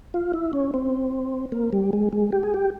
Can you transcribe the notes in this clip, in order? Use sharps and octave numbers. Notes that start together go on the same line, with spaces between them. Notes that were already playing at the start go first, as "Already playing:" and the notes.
F4
E4
C#4
C4
A#3
G3
G#3
G#3
G4
G#4
G4